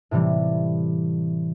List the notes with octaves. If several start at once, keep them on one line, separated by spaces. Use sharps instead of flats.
A2 C3 E3 G3